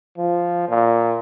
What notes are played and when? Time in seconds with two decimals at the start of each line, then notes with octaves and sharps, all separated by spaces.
0.18 F3
0.69 A#2